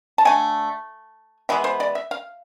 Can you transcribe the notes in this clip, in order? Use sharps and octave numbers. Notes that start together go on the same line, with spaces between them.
A5
D3 A3 G#5
E3 G#3 B3 E5
C5
D5
E5
F5